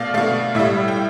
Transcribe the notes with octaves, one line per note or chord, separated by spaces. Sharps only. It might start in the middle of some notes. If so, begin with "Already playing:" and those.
Already playing: B2 A3 D5 F5
B2 A3 F5
A2 G3 E5
G5